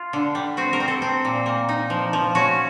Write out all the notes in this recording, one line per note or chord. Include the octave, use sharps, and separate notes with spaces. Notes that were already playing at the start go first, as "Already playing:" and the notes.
Already playing: F4
D3
G3
C4 F#4
A#4
C4
A4
C4
A#2
A#3
D#4
F3
F3
C#4 F#4